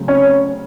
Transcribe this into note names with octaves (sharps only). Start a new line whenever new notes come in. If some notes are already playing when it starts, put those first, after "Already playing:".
Already playing: C#3 F#3 A3 C4
C#4 C#5